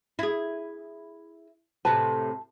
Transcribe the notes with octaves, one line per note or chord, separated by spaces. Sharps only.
E4 G#4
A2 C3 B4 A5